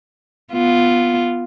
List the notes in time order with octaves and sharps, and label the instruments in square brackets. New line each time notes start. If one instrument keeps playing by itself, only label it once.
[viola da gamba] B3 F4